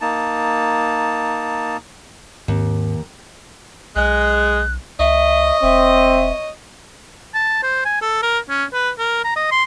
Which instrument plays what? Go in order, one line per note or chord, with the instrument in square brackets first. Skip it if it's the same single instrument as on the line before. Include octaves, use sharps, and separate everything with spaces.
[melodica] A#3 D#4 A5
[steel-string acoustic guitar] D#2 [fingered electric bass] G#2 C4
[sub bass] B1 [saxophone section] G#3 [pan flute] F#6
[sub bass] C#2 [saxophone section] C#5 D#5 [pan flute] E5
[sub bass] E1 [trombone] C4 [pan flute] E5
[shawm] A5
C5
G#5
A4
A#4
C#4
B4
A#4
A#5
D#5
C6